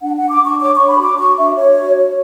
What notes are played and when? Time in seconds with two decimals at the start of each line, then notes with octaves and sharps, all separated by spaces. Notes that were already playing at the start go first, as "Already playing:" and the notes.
0.02 D4 F#5
0.16 D4 F#5
0.30 D6
0.41 D4 C#6
0.60 C#5 D6
0.74 D4 C#6
0.88 B5
0.98 F#4 D6
1.18 F#4 C#6
1.37 D4 E5
1.56 D4 C#5
1.76 F#4
1.95 C#5